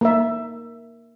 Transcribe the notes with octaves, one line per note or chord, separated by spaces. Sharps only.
A#3 A#4 E5